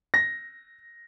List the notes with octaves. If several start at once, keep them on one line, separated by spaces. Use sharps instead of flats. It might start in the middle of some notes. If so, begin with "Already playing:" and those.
A#6